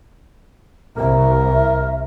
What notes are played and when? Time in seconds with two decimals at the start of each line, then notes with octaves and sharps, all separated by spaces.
0.97 C2 A#4 E5